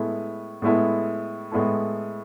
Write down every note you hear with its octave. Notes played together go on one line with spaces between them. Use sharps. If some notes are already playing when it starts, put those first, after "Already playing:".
Already playing: A2 G#3 B3 E4 A4
A2 G#3 B3 E4 A4
A2 G#3 B3 E4 A4